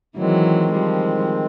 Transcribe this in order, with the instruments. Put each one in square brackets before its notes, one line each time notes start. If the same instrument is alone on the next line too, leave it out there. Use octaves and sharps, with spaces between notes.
[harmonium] D#3 G#3 C4 [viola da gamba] E3 F#3
[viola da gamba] F3 G3